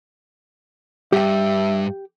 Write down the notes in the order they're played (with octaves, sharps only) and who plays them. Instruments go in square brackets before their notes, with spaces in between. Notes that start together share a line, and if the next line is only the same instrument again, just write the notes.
[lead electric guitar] G2 [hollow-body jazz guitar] G4 G5 [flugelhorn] E5